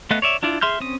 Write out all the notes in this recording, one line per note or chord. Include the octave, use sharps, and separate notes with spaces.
A3 B3 D#5 F5 F#6
C#5 D5 E5
D4 E4 F4 D5
G#4 E5 C6 F6 G6
C4 C#4 D#6